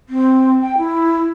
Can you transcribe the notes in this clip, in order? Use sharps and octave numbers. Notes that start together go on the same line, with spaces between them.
C4
G5
E4